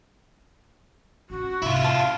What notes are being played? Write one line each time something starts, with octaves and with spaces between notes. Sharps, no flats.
C#4 F4 F#4
A2 C3 E4 F4
F5 A5